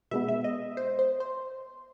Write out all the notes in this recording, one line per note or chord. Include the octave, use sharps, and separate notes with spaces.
B2 G#3 B3 E5
E5
D#5
C5
C5
C5